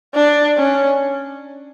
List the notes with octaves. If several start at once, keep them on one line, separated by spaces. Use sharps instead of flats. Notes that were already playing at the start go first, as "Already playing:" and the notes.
D4
C#4